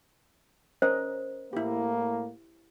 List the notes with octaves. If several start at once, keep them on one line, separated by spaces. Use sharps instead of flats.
C#4 A#4 C5 D#5
A2 A#3 E4 G4